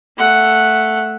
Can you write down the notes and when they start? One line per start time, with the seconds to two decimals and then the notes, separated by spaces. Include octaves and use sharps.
0.18 A3 F#5